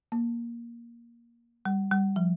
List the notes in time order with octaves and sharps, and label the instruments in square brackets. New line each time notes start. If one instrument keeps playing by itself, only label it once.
[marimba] A#3
G3
G3
F3